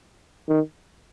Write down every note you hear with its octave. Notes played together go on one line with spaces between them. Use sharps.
D#3